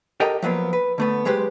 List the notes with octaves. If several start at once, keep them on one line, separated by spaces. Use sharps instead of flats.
G4 A4 A#4 D#5 F#5 G5
F3 F#3 A#3 B3
B4
D3 A3 B3
F#3 G#3 G4 B4 C5